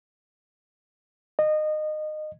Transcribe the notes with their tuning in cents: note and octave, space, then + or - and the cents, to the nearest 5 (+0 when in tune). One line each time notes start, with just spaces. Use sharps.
D#5 -20